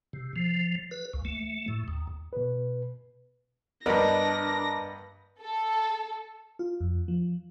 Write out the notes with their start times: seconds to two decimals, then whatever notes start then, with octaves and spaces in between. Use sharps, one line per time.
0.13 C3
0.36 F3
0.91 B4
1.13 C#2
1.25 A3
1.68 A2
1.88 D#2
2.33 B2 B4
3.86 G2 B3 D4 A#4 D5 D#5 A#6
5.42 A4
6.59 F4
6.81 F2
7.08 F3